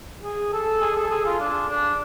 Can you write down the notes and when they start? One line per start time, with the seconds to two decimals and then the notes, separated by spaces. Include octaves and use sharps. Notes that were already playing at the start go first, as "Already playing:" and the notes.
0.23 G#4
0.53 A4
0.81 G#4
0.96 A4
1.11 G#4
1.25 F4
1.40 D4
1.69 D4